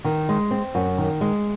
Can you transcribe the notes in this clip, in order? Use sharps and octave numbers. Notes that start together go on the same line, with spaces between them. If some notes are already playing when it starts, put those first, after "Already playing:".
D#3
G#3
C4
F#2
D#3
G#3